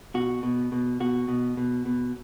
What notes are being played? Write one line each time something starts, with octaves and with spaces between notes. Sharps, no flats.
B2 F#4
B2
B2
B2 F#4
B2
B2
B2